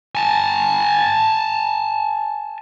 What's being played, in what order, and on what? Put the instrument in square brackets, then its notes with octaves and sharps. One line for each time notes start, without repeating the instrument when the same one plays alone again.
[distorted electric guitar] G#5 A5